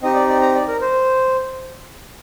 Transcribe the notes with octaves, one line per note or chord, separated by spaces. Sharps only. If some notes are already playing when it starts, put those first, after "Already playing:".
C4 D#4 G4 D#5
D5
D5
A#5
D5
A#4
C5